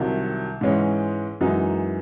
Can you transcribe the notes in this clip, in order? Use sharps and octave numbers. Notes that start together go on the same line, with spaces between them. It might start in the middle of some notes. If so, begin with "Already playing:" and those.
Already playing: C2 C3 D#3 F#3
G#2 E3 G#3 C#4
F#2 E3 G#3 D#4 F#4